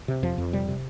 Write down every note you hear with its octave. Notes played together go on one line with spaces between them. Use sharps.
C3
F2 F3
F2
C3 G3
C3